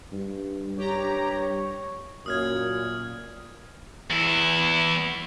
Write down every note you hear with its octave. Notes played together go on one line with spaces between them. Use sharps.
G2
G2 G4 C#5 A#5
F#2 A#2 D#6 F6 G#6
E2 E4